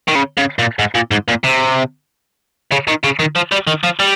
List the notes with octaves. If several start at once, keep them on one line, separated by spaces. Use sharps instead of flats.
D#3
C#3
C#3
A#2
G#2
A#2
G#2
A#2
C3
C#3
D#3
C#3
D#3
F3
G3
D#3
F3
G3